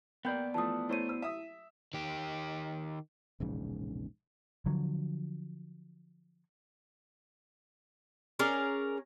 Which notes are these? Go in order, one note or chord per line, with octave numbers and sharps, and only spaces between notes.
A#3 B3 D5 G5 G6
E3 F3 A3 A5 D#6
A3 E4 C5 C#5 D#7
C5 E6
E5 D#6
D#3 G4
E1 A#1 G#2 C#3
D3 F3 F#3
C#4 G#4 A#4 D5